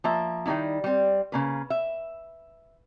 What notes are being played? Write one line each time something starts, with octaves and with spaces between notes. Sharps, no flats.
F3 A#3 E5
D#3 G3 A#3 D#4 E4
G3 C4
C#3 A#3 B4
E5